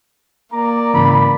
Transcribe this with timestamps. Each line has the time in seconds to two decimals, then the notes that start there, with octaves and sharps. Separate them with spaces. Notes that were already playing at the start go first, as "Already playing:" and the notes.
0.52 A#3 D5 A#5
0.94 G#2 C#3 E3 B5